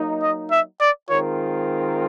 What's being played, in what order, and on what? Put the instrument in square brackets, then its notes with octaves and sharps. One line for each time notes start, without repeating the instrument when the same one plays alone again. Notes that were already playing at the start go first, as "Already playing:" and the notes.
Already playing: [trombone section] F#3 A#3 D#4
[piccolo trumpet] D#5
E5
D5
[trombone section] D#3 G#3 C4 F4 A#4 [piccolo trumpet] C#5